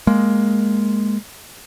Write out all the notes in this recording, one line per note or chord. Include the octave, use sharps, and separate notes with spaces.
G#3 A#3